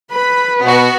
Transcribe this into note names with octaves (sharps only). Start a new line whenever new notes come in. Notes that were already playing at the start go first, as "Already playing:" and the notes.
B4 B5
B2 B3 F#4